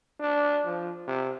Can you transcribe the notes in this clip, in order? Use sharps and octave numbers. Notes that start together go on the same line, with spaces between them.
D4
F3
C3